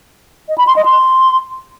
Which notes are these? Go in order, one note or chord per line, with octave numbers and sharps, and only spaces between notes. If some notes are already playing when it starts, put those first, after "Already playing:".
D#5
B5
C6
D#5
C6